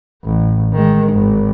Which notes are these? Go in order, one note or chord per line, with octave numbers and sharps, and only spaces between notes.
A1
D#3 G#3
G#1